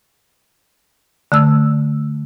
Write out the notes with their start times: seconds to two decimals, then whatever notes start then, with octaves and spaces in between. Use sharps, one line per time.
1.32 D3 A3 E6